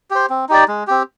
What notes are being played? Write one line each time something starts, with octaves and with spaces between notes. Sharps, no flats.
G4 C5
C4
D#4 G4 D5
G#3
C4 G4